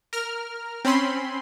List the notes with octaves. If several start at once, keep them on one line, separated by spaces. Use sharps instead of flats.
A#4 F6
C4 C#4 B5 C6